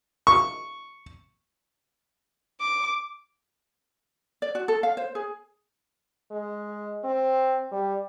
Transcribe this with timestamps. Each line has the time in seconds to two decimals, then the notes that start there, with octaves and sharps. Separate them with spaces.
0.27 C#6
2.61 D6
4.42 D5
4.55 F#4
4.68 A4
4.83 F5
4.97 C5
5.15 G#4
6.32 G#3
7.04 C4
7.72 G3